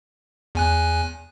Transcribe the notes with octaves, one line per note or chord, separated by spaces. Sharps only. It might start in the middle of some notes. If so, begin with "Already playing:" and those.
E2 G#5 F#6